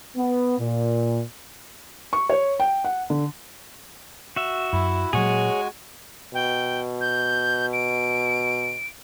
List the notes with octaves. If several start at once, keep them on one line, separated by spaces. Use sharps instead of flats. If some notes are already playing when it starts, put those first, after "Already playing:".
B3
A#2
C#6
C#5
G5
F#5
D3
F#4 E5
F#2 E4
A#2 F#3 G#3 F#4 G#4 C#5 G#5
B2 G5
G6
D7